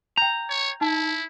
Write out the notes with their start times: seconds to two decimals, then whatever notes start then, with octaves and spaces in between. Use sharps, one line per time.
0.17 G5 A#5 G6
0.50 C#5
0.81 D#4 E4 A5